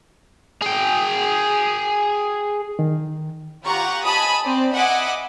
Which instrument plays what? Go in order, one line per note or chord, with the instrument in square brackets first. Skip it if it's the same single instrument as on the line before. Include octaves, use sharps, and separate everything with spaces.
[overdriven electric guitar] G#4 G5
[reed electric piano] D#3
[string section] F4 G4 F#5 A#5 C#6
D#5 G#5 A5 B5 D#6
C4 D5
D#5 E5 F#5 G#5 B5 D6